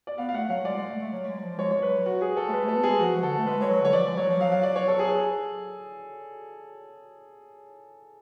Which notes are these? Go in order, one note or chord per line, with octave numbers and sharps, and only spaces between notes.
D5
B3 F5
F5
A3 F#5
F#3 F5
G#3 D5
G#3
A3
A3
F#3
G#3
F#3
F3
G#3 C#5
C#5
F#3 B4
F#4
G#4
A4
A3
G#3 B4
A3
A4
B3
G#3 G#4
F3 F#4
F3
D3 A4
A3
G#3 B4
G#3
C#5
F#3
D3 C#5
F3 D5
G#3
F#3 C#5
F3
F#3 F5
F5
D5
C#5
A4
G#4
G#4